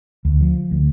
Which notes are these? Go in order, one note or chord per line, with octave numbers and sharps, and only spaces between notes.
D2
F3
D2